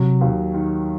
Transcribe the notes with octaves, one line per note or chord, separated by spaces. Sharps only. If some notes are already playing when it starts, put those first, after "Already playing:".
Already playing: C3 F#3
D#2
D#3